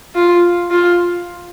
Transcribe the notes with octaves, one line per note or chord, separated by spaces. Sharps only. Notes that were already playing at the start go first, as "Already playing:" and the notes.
F4
F4